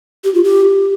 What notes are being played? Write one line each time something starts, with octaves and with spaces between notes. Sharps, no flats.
G4
F4
G4